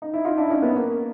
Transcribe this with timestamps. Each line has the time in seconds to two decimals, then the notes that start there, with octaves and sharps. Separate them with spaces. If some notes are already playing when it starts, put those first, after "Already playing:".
0.02 D#4
0.14 E4
0.24 D#4 F4
0.37 D4 E4
0.50 C#4 D#4
0.62 B3
0.76 A#3